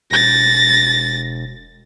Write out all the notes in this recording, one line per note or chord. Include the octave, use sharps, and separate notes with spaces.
E1 A6 A#6